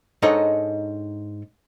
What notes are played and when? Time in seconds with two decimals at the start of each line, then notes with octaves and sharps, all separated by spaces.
0.22 G#2 D4 D#4 A4 C#5 D#5